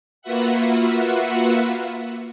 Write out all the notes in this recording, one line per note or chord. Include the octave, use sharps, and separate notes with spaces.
A#3 F4 F#4 B4 E5 F#5